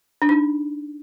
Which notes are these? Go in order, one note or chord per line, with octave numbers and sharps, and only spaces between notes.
D4
D#4